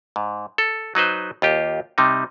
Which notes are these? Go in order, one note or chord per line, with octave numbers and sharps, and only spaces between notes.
G#2
A4
F#3 D#4 B4 C5
D#2 F4 G4
C3 G3 D#4